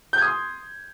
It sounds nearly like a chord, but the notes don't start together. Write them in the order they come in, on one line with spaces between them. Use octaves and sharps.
G6 G#6 D#6 C6